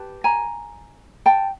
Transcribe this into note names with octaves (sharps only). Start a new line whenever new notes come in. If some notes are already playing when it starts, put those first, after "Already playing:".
Already playing: G4 B4 A5
G#5 A#5
G5 A5